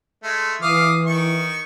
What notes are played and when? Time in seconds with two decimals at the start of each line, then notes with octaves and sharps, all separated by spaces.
0.23 G#3 A3
0.62 E3 F5 D6 D#6
1.07 D#3 C#6